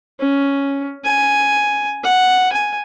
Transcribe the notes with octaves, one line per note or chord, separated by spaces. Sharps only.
C#4
G#5
F#5
G#5